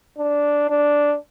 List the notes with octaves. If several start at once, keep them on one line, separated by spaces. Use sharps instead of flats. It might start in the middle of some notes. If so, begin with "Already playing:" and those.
D4
D4